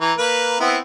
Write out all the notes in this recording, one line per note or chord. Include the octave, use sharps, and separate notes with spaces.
E3 A#5
A#3 B4
B3 C4 E4